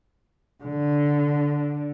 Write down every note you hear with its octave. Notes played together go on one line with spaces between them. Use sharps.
D3